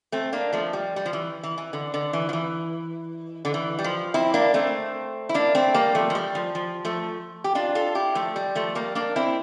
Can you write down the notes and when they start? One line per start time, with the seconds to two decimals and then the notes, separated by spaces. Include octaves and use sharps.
0.12 A3 C4
0.33 A#3 D4
0.53 F3 A3
0.73 G3
0.96 G3
1.05 F3
1.13 E3
1.43 E3
1.58 E3
1.73 D3
1.94 D3
2.13 E3
2.29 F3
2.33 E3
3.45 D3
3.54 E3
3.79 G3
3.84 F3
4.14 C4 E4
4.34 A#3 D4
4.54 A3 C4
5.29 E4
5.34 A#3 D4
5.55 A3 C4
5.74 G3 A#3
5.95 F3 A3
6.10 F3
6.15 G3
6.35 F3
6.55 F3
6.85 F3 A3
7.44 G4
7.55 D4 F4
7.75 F4 A4
7.95 E4 G4
8.15 F3 A3
8.36 G3
8.55 F3 A3
8.75 G3 A#3
8.95 A#3 D4
9.16 C4 E4